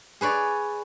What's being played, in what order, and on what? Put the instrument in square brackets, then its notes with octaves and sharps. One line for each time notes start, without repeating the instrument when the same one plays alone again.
[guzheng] G#4 B4 C#5 D5